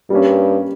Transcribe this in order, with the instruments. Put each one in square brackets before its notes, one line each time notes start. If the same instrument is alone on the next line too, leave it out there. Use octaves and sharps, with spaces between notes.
[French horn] G2 [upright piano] G3 A#3 C#4